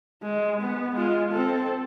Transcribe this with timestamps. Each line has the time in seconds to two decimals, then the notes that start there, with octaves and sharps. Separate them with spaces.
0.23 G#3
0.61 B3
0.96 G#3 F4
1.33 C4 A4